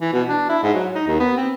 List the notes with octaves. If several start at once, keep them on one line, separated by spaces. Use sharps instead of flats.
E3
B2
D4
E4
G#2
F#3
D#4
D#2
B3
C4